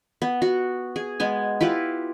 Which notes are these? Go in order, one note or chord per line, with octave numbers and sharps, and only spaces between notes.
B3
F#4
G#4
G#3 B3 G#5
E4 F4 G4 B4